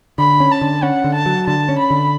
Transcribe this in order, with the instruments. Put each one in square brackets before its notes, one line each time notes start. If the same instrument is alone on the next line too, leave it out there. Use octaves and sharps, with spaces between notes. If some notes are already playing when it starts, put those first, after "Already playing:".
[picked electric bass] D3 [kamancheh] B5
[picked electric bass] C#4
[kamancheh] A5
[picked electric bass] D3
[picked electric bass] C#4 [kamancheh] F#5
[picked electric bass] D3
[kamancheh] A5
[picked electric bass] F#3
[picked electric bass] D3 [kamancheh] A5
[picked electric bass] C#4
[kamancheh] B5
[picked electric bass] D3